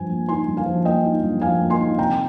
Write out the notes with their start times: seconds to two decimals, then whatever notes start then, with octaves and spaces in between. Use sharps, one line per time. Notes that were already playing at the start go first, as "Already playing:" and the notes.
Already playing: G2 F3 G#5
0.10 A#3
0.29 D#4 G#5 C6
0.48 G2
0.57 F5 G#5
0.66 F3
0.85 A#3 D#5 G5
1.05 D#4
1.23 G2
1.41 F3 F5 G#5
1.61 A#3
1.70 G#5 C6
1.80 D#4
1.98 C3 G5 A#5